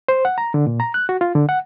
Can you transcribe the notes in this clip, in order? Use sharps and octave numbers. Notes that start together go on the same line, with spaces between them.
C5
F#5
A#5
D3
A#2
A#5
F#6
F#4
F4
D3
F#5